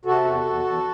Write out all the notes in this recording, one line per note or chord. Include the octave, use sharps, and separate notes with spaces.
C3 F#4 A4
E2
E2
E2